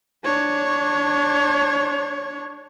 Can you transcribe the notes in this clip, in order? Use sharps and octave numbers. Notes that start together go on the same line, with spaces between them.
D4 C#5